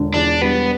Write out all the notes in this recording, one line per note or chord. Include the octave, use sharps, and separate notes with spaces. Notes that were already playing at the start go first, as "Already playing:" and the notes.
Already playing: E1 D3
E2 D4
G3 B3